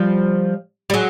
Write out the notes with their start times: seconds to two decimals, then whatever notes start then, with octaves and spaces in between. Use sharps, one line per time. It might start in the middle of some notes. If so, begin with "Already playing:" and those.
Already playing: F3 G3
0.90 G3
0.94 F#3 G#3